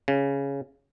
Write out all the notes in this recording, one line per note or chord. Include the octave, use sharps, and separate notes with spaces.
C#3